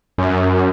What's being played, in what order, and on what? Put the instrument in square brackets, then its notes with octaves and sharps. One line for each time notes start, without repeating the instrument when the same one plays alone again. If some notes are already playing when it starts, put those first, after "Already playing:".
[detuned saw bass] F#2